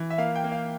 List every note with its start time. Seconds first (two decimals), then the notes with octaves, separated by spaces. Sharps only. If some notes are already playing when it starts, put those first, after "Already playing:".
Already playing: E3
0.10 E5
0.18 A#3 F5
0.35 G5
0.44 A#3
0.52 F5